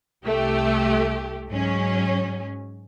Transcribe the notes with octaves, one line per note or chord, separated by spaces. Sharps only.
C2 A3 G4
G#2 F#3 C#4